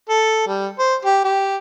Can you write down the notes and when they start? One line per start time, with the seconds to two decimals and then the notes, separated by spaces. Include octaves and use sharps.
0.09 A4
0.48 G3
0.79 C5
1.05 G4
1.25 G4